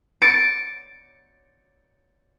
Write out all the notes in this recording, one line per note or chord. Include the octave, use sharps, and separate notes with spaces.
A6 C#7 D7